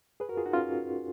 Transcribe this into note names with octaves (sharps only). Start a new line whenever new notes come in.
G#4 B4
F#4 A#4
F4 G#4
D#4 F#4
C#4 F4